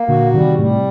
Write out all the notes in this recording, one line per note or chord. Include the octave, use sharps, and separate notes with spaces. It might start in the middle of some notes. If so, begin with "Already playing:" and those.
Already playing: A#3
A#2 D3 F#4
C3 D#3 G3
A2 C3 G3